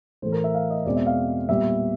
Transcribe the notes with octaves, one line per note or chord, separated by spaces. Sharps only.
A2 E3 A3 C5
A#4
E5
F5
D#5
E2 B2 G#3 C4 D5
E5
F5
A#2 G3 B3 E5